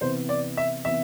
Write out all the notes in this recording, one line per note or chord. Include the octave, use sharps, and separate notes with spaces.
C3 E3 B3 E4 B4 C5
D5
E5
C3 E3 B3 E4 E5